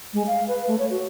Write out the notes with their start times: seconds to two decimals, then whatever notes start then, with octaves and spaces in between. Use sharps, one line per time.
0.14 G#3
0.27 F5
0.48 B4
0.67 A3
0.79 C#5
0.90 F#4